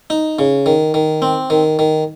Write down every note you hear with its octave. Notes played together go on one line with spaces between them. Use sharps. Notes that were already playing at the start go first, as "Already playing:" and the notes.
D#4
C#3
D#3
D#3
C4
D#3
D#3